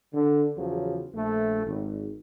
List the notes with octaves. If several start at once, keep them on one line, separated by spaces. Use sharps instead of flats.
D3
E2 C#3 F3 F#3
A#1 A3
G#1